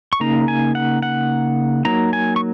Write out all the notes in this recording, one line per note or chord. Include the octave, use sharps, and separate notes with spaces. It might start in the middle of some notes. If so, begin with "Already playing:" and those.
C#6
C#3 A#3 D#4 A#5
G#5
F#5
F#5
F#3 A#3 D#4 A#5
G#5
C#6